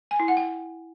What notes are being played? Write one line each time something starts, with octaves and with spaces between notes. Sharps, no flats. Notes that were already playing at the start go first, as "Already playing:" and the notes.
G#5
E4
F#5
G5